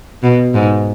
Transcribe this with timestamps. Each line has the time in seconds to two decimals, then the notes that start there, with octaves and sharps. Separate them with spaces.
0.23 B2
0.54 G#2